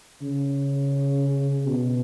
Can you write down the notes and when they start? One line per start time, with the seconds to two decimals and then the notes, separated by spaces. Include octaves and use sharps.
0.22 C#3
1.67 B2